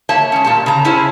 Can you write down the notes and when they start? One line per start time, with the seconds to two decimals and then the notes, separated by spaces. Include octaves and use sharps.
0.09 A#3 C#5 E5 A5
0.32 G#3 C#4
0.44 A#2 G4 A5
0.66 C#3 A#5
0.85 C#4 E4 G#4 C5 C#5